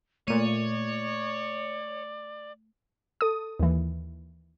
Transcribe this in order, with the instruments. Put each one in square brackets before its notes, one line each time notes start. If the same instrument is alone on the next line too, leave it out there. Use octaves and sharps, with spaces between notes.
[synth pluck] A#2 D#7 [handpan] A3 [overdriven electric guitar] C#5 [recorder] D5
[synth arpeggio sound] A4 D#6
D#2 E3